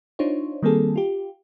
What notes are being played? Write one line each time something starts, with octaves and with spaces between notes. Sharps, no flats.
D4 D#4 F4 C5 C#5
D#3 G3 A#3 C4 G#4 A4
F4 G4